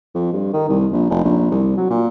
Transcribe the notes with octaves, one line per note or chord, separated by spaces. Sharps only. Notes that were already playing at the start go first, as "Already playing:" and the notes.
F2
G2
D#3
C2
A#1
F1
A#1
C2
F#3
A#2